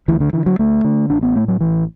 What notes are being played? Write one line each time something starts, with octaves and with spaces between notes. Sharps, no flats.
D2 E3
D3
D3 E3
F#3
D2 A3
D3
A1 D4
B3
A2 A3
F#3
A1 E3